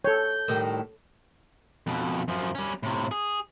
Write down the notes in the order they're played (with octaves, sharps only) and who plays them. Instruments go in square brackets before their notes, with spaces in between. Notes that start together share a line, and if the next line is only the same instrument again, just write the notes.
[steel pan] A4 C#5 [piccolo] G6
[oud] A2 D#3 G3
[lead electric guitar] F2 B2
F#2 F3
G3 C#4
A2 C3
G#4